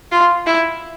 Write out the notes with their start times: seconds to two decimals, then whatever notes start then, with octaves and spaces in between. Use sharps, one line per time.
0.12 F4
0.46 E4